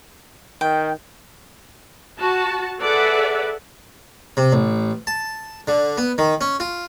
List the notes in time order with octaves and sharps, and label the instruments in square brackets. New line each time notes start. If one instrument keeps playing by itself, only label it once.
[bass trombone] D#3 [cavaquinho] G5
[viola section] F#4 A5
G#4 A4 B4 D5 E5 F#5
[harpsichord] C3
A1
A5
D3
B3
D#3
C#4
F4